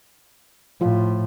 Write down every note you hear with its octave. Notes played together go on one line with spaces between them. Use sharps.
A2 F3 F4